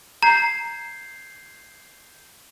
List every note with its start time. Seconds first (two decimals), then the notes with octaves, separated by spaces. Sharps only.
0.23 A#5 G6 G#6 C7